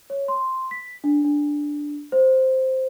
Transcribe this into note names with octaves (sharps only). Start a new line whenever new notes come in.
C#5
C6
B6
D4
D4
C5